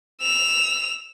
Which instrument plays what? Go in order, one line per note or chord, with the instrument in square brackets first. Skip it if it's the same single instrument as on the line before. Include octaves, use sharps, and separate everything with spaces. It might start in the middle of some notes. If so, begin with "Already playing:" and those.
[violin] E6 F7